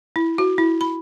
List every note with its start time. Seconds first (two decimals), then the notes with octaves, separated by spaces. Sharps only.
0.16 E4
0.38 F#4
0.58 E4
0.81 B5